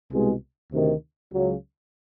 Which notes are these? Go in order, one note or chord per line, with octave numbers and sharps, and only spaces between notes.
C2 B2 G#3
D2 C3 D#3
C#2 C#3 F#3